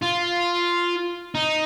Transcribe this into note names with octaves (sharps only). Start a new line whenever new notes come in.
F4
D#4